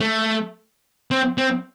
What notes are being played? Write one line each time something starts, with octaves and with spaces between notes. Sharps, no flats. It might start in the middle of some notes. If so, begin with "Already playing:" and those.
A3
C4
C4